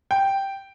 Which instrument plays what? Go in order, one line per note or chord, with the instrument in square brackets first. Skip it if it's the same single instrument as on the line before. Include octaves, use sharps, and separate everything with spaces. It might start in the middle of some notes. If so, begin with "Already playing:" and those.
[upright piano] G5